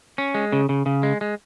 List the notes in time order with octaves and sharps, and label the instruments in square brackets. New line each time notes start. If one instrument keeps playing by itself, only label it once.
[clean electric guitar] C#4
G#3
C#3
C#3
C#3
G#3
G#3